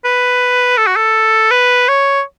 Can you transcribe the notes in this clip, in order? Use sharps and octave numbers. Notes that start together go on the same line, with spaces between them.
B4
A4
F#4
A4
B4
C#5